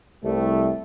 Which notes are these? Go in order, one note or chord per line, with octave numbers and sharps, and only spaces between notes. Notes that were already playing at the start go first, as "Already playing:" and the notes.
C2 G3 A3